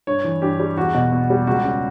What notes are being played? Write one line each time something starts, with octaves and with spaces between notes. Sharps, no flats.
G2 C#5
E3
G2 G4
G3
E2 F#4
B2
B3
G3
C#2 F#4
C#3